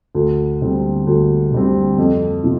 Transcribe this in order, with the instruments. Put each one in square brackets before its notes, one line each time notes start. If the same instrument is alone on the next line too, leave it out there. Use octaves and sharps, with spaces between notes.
[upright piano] D2
D3 G3 C4
D2
D3 G3 C4
F2
C3 F3